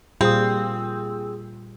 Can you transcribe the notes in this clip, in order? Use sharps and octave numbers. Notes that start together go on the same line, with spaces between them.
A#2 G3 C4 F4 G#4 D#6